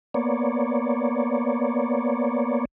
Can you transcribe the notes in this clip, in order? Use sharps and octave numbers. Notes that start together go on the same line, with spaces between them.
A#3 B3 C#5 D5